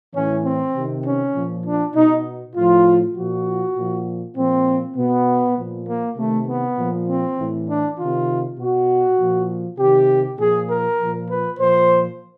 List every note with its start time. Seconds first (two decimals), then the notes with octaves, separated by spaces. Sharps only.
0.14 A2 E3 C#4
0.44 C4
0.75 C3 D#3
1.05 C#4
1.34 A#2 F3
1.65 D4
1.95 B2 D#4
2.55 A2 F3 F4
3.15 A#2 F3 F#4
3.76 A#2 F3
4.36 A#2 F3 C4
4.96 B2 B3
5.57 A#2 F3
5.87 A#3
6.17 C3 D#3 A3
6.47 B3
6.77 A#2 F3
7.07 C4
7.38 A2 E3
7.68 D4
7.97 C3 D#3 F4
8.58 B2 F#4
9.18 A#2 F3
9.78 C3 D#3 G4
10.39 A#2 F3 G#4
10.69 A#4
10.99 A#2 F3
11.29 B4
11.59 A#2 F3 C5